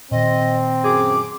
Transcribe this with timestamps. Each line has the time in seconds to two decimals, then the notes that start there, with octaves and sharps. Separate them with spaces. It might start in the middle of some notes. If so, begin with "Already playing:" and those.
0.11 A#2 D#3 C4 D#5
0.84 F#2 G#4 D6